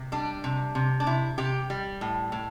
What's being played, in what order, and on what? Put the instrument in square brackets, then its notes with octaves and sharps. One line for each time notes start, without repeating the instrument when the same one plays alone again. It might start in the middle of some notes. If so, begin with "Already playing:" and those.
Already playing: [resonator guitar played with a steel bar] C3
G3 D4
C3
C3
D4
C3 E4
C3 G4
G3
A2
A2